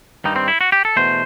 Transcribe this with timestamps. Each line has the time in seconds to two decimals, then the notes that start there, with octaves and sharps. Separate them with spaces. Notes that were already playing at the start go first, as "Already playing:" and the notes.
0.24 G2 D#3 G3 D#4
0.36 C4
0.48 E4
0.61 F#4
0.72 G4
0.85 A4
0.96 E2 B2 A3 C5